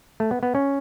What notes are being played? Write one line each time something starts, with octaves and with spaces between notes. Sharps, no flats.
A3
B3
B3
C#4